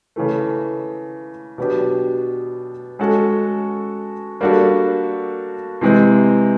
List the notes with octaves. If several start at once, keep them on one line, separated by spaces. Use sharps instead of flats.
C#3 E3 A3
B2 F#3 B3 D4 G4
G#3 C#4 F#4 A4
G3 A#3 D4 F#4 A4
C3 E3 G#3 C4